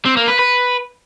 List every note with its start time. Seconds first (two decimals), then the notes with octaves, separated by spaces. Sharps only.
0.05 C4
0.17 A#3
0.28 B4
0.39 B4